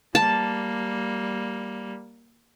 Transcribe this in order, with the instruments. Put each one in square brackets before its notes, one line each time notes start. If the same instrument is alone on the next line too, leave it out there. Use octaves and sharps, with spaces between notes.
[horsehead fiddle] G3 A#3 [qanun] A5